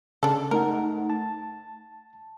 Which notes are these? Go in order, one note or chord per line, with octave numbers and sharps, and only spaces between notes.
C#3 D4 A4
A3 D#4 A#4 F#5
A5